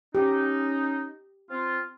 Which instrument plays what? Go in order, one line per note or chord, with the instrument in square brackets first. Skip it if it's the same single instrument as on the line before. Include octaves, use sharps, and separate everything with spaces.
[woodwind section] C#4 D#4 [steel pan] G4
[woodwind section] C4 F4